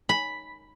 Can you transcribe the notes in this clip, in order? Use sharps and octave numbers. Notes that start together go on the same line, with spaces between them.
B5